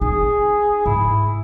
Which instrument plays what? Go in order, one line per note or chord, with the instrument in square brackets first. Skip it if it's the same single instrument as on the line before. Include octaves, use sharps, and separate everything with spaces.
[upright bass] D#4 [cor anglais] G#4
[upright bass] G#2 [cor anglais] E4